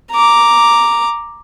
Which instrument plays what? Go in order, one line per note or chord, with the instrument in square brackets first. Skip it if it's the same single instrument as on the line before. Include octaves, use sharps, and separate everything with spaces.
[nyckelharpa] A#5 D6